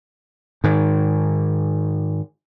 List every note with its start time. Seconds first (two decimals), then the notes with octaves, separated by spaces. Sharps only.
0.64 G#2 D#3